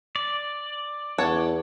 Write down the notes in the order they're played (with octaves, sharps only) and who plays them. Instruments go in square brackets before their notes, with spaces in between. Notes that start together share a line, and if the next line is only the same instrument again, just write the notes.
[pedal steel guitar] D5
[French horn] E2 [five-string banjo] A4 C#5 F#5